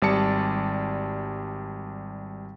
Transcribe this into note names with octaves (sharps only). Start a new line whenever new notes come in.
G#1 G3 D5 A5 C#7